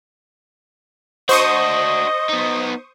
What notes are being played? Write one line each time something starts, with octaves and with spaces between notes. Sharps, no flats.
D4 F#4 C5 D#5 C#6 D#6
B3 D#4